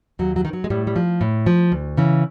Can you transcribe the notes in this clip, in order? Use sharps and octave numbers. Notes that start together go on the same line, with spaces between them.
D#2 F#3
F#3
D#3
F#3
G#3
A2 G3
G3
F3
A2
F3
D2
C#3 E3